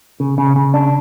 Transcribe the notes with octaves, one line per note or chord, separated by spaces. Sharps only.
C#3
C#3
C#3
D4